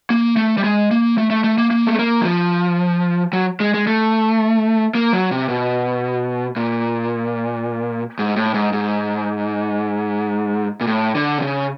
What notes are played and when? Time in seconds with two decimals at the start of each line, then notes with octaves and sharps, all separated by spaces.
0.10 A#3
0.36 A3
0.57 G3
0.64 G#3
0.91 A#3
1.18 A3
1.30 A3
1.44 A3
1.58 A#3
1.71 A#3
1.87 A3
1.99 A#3
2.21 F#3
2.25 F3
3.33 F#3
3.60 G#3
3.74 G#3
3.87 A3
4.95 A#3
5.13 F#3
5.31 C3
5.49 B2
6.56 A#2
8.19 G#2
8.36 A2
8.54 G#2
8.73 G#2
10.81 A#2
10.87 A2
11.15 D3
11.38 C3
11.42 C#3